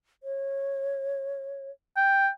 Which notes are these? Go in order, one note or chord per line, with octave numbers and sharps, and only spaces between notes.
C#5
G5